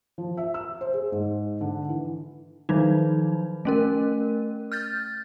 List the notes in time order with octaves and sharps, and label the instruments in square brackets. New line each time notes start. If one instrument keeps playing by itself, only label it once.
[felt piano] F3
E5
E6
C5
G#4
G#2
D3
E3
[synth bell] D#3 F3 F#3 D#4
A3 C#4 A#4
F6 G6 A6